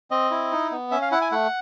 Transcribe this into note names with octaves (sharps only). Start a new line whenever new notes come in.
C4 D#5
E4
D#4
B3
C#4 E5
F5
E4 F#5
G#5
A3 F#5